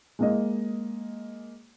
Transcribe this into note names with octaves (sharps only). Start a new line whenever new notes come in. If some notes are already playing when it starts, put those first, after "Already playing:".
G#3 A#3 D#5